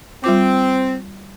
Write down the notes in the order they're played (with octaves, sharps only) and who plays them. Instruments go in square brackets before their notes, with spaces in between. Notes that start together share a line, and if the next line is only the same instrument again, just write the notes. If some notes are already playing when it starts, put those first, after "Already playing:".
[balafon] G3 F4 D6 [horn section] C4